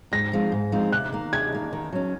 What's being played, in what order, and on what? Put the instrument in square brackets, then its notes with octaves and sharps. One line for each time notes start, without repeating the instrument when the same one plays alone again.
[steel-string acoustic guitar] G#2 [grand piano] A#6
[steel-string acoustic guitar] F3 G#3 C4 D#4
G#2
F3 G#3 C4 D#4
[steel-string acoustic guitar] C3 [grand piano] F#6
[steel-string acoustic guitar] D#3 A#3
[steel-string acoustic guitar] C3 [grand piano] G#6
[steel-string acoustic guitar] D#3 A#3
D#3
F#3 C#4